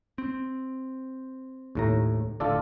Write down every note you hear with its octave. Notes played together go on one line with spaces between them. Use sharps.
C4
D#2 A2 A#5
F1 A2 D3 F4 A4 D5